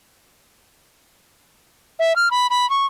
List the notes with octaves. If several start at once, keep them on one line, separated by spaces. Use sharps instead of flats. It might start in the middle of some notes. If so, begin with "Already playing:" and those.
E5
F6
B5
B5
C#6